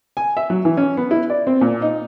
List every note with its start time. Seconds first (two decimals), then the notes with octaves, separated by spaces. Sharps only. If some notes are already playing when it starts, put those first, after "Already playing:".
0.17 G#5
0.37 E5
0.50 F#3
0.65 E3
0.77 C#4
0.97 B3
1.11 E4
1.30 D5
1.47 C4
1.61 A#2
1.82 D#4